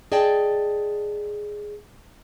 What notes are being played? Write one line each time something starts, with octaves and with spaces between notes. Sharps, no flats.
G#4 D5 D#5 G5 A5